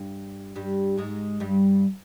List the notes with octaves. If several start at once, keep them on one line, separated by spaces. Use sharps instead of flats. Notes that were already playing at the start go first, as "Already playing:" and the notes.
Already playing: G2
G2 G3
G#2 G#3
G2 G3